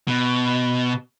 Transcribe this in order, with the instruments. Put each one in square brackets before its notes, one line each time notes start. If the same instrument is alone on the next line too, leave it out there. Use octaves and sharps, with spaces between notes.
[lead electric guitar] B2